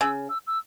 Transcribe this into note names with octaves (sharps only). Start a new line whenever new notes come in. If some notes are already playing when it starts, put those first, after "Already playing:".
C#3 E6
E6
E6